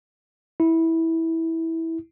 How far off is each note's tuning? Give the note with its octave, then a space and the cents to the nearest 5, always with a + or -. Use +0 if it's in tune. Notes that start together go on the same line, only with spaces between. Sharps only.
E4 -15